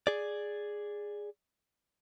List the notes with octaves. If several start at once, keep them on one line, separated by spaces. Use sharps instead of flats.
G#4 D5